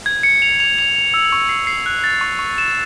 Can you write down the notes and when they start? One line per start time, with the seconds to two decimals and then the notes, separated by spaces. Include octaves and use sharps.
0.06 G#6
0.23 C#7
0.42 F7
0.60 F7
0.78 F7
0.96 F7
1.14 E6
1.32 C#6
1.49 C7
1.67 C7
1.86 F#6
2.04 A6
2.21 C#6
2.39 C#6
2.58 E7